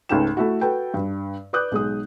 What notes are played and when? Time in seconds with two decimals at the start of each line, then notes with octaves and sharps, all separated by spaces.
0.09 C#2 G#2 A3 D#4 G5 E7
0.37 A3 E4 F#4
0.61 F#4 A4 B4 G5
0.94 G2
1.53 B4 D5 D6 D#6 F#6 G6
1.71 B1 G#3 D#6